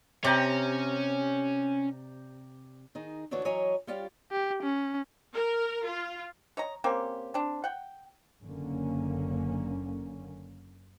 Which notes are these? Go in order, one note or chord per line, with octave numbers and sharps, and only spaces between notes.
C3 C#4 D5 G5 A#5
D#3 D#4 G#4
D2 E3 D4 F#4 C#5
E3 F#3 C#5 D#5 G#5 A#5
G3 C#4 F4 G4 D5 F5
G4
C#4
A#4
F4
C#5 D#5 A#5
A#3 C4 C#4 G4
C4 D4
F#5 G5
F#1 F#2 D3 A#3 C#4